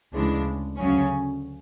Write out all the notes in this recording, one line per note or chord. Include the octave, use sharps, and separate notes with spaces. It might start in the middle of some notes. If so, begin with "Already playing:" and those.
D2 C#3 E3 G#3 D4
D2 C#3 F#3 C#4